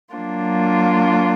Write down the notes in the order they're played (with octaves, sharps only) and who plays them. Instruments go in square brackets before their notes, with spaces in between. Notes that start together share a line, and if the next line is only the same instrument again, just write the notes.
[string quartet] F#3 A#3 D4 F4